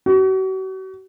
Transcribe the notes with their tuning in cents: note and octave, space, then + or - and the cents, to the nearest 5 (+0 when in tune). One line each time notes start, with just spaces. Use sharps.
F#4 +40